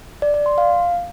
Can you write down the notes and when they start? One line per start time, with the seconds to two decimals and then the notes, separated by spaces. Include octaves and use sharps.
0.22 D5
0.34 D5
0.46 C6
0.58 F5